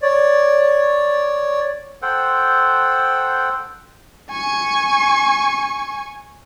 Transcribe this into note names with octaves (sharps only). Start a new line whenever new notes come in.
C#5 D5
A4 C5 F#5 G5
G#5 C#6